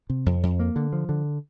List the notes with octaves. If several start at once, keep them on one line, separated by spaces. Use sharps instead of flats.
C3
F2
F2
A#3
D3
F3
D3